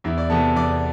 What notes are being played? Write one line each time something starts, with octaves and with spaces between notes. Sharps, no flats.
E2 E4 E5
D5
C3 E3 B3 A4 A5
E2 D5 D6